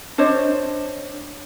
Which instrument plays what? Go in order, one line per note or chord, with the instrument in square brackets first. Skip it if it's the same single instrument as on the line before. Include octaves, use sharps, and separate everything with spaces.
[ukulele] D4 C5 C#5 D#5